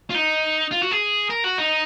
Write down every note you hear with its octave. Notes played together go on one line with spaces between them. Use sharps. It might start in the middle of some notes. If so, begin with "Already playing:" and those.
F4
D#4
F4
F#4
G#4
A#4
F#4
D#4